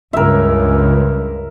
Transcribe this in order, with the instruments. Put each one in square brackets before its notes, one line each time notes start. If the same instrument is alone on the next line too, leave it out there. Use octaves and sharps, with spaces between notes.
[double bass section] C#2 G2 [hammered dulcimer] A#4 E5